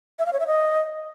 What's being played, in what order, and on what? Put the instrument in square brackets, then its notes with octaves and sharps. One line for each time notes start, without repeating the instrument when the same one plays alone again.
[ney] E5
F5
C#5
E5
D#5